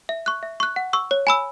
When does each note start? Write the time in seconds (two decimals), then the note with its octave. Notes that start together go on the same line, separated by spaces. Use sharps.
0.09 E5
0.26 C#6 F#6
0.43 E5
0.60 C#6 F#6
0.76 F#5
0.93 C#6 E6
1.11 C#5
1.27 G#5 B5 E6